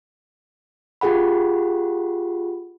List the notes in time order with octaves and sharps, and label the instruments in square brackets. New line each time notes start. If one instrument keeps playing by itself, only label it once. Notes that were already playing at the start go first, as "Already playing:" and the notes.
[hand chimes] F4 G4 G#4 F#5 B5